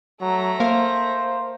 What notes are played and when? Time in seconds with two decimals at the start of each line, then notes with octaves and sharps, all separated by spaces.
0.21 F#3 A3 A#5
0.60 A#3 A#4 C5 F5